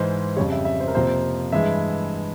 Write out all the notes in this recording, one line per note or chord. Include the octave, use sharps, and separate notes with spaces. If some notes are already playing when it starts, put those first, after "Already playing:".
Already playing: G#2 E3 G#3 C5
F2 C#3 G3 C#5
E5
E5
C5
A#4
F2 C3 F3 A#3 C5
G2 E3 G#3 E5